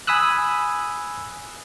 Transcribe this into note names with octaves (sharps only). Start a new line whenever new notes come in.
G#5 B5 D#6 E6 F#6